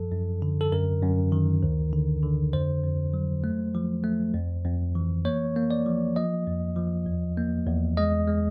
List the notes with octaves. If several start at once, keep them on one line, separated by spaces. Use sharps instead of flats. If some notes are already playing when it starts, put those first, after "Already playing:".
Already playing: F#2 F3 A4
F#2
D3
A4
F#2 A#4
F#2
D#3
D2
D3
D3
F2 C5
F2
F#3
A3
F3
A3
F2
F2
E3
A#3 C#5
A#3
D5
F3
F3 D#5
F2
F3
E2
A#3
E2
G#3 D#5
G#3